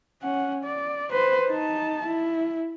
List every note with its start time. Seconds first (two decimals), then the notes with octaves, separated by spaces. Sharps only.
0.23 C#4 F#5
0.64 D5
1.11 B4 C5
1.49 D#4 A5
2.06 E4